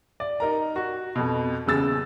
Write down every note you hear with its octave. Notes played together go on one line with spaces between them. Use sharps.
D5
D#4 A#4 A#5
F#4
F2 B2
D#1 E2 C#3 E6 A6